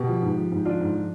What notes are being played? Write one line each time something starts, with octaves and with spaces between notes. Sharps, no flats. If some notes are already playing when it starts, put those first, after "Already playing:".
Already playing: B2 G4
F3
G#2
F3
G#2
F3 D4 F4
G#2
F3